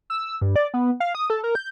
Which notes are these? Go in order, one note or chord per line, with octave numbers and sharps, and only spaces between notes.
E6
G2
D5
B3
F5
D#6
A4
A#4
G6